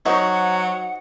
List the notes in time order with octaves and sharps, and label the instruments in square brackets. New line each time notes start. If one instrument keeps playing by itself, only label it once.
[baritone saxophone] F#3 [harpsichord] D#4 [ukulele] F#4 C5 E5 [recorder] F#5